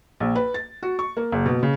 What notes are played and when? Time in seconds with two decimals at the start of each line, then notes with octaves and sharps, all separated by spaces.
0.20 A#1
0.36 B4
0.54 A6
0.83 F#4
0.99 C#6
1.17 A#3
1.32 F#1
1.45 B2
1.63 C#3